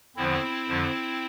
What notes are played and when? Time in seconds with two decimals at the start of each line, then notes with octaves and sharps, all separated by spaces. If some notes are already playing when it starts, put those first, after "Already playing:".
0.16 E2 D3 F3 C4 E4
0.67 F2 D3 F3